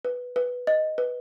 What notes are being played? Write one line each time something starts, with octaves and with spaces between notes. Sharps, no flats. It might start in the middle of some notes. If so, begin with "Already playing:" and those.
B4
B4
D#5
B4